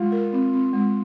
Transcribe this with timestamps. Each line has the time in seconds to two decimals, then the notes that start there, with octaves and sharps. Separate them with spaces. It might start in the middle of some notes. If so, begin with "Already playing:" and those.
Already playing: G#3 F4
0.12 A#4
0.33 C4
0.53 C4
0.73 G#3